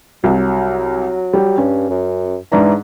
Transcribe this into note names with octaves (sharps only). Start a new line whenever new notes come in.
C2 F#3
G3
G2 C#4
F#2
G#2 E3 D4 A#5